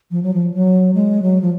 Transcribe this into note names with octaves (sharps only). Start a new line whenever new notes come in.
F3
F#3
F3
F#3
G#3
F#3
F3